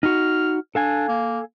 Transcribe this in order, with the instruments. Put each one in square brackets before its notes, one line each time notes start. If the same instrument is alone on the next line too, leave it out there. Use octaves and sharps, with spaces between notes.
[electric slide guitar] D#4 F#4 [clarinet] F6
[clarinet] D4 [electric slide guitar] A4 F5 G#5
[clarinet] A#3